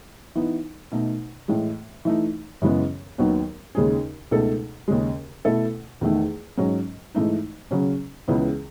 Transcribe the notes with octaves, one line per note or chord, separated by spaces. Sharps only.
E3 B3 D#4
B2 A3 D#4
A2 E3 G#3
E3 A3 D#4
F#2 C#3 E3 G#3 B3
D#2 D#3 F#3 B3
D#2 C#3 G#3 D#4 G#4
C#2 B2 A3 D#4 A4
D#2 C#3 G#3
B2 A3 E4 A4
E2 D#3 A3
G#2 F#3 C#4
G#2 E3 A3 D#4
C#3 F#3 C#4
C#2 C#3 E3 B3